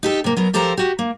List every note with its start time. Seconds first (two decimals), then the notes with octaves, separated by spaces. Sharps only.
0.03 D#4 G4 A4
0.24 C3 A#3
0.37 F#3 B3 A#4
0.53 F3 G4 A4 A#4 C5 A#5
0.77 F#4 G4
0.99 A#3